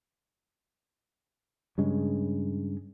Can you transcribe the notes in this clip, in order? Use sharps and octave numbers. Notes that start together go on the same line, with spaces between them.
G2 C#3 G#3